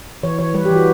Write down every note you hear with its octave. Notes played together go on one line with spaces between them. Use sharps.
E3 C#5
E3 C#5
G3 B4
G4
E3
F#4